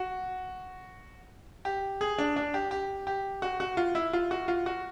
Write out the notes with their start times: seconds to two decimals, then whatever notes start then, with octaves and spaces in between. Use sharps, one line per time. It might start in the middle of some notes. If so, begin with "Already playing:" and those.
Already playing: F#4
1.65 G4
2.01 G#4
2.18 D4
2.36 D4
2.54 G4
2.71 G4
3.07 G4
3.42 F#4
3.60 F#4
3.77 F4
3.95 E4
4.13 F4
4.31 F#4
4.48 F4
4.66 F#4